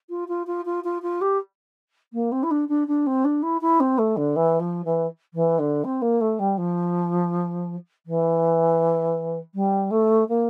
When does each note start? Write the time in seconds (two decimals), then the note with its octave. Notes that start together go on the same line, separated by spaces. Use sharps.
0.10 F4
0.28 F4
0.47 F4
0.65 F4
0.84 F4
1.02 F4
1.21 G4
2.13 A#3
2.32 C4
2.43 E4
2.51 D4
2.69 D4
2.87 D4
3.06 C4
3.24 D4
3.42 E4
3.61 E4
3.80 C4
3.98 A3
4.17 D3
4.36 E3
4.60 F3
4.85 E3
5.34 E3
5.59 D3
5.84 C4
6.02 A#3
6.21 A3
6.39 G3
6.57 F3
8.06 E3
9.54 G3
9.91 A3
10.28 A#3